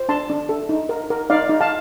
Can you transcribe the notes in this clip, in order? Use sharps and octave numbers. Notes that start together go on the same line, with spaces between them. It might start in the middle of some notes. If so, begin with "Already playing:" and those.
Already playing: C5
D4 A5 C6
D4
A4
D#4
A#4
A#4
D#4 D5 F5
D#4
F5 A5